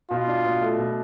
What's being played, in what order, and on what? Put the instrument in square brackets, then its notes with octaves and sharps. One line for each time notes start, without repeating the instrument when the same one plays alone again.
[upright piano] B2 [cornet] F4
[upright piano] D4
B2
A3
B2